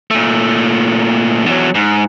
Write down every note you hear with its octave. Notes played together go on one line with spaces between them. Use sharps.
A#2 A3
E2 F#3
G#2